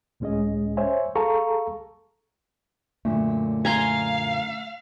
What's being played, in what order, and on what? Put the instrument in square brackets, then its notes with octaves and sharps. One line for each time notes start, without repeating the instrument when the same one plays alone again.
[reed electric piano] C#2 A2 G#3 C#4 G#4 D#5
C5 C#5 E5 G#5
G#4 A4 F5 A5 A#5 C#6
[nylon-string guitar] F#2 A#2 D3 [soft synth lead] A3
[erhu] F5 [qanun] G#5 A#5 C6